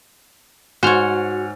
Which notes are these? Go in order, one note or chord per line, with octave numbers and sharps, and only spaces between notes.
G#2 F#4 C5 C#5 F#5 G#5 F6